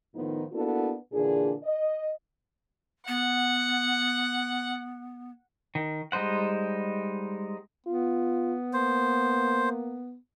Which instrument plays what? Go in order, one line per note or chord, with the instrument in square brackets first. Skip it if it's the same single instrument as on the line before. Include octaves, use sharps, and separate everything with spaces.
[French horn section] A2 D#3 F3 B3 D#4 F4
A#3 B3 D4 E4 F#4 A4
A#2 D3 E3 D4 G#4
D#5
[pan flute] B3 [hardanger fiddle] F#5
[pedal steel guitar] D#3
G3 G#3 D#4 C5 F#5
[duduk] B3 [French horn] F4
[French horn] A#3 [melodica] C5